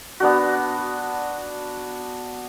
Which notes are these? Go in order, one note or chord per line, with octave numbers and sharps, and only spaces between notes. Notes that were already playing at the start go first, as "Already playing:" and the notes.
B3 D4 F#4